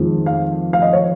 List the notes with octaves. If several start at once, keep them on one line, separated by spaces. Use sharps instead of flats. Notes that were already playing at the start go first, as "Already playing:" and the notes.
Already playing: F2 D#3 G#3
F5
F5
D#5
C#5